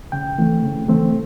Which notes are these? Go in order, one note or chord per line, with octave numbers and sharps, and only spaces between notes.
C#3 G5
E3 A3 C4
C#3
E3 A3 C4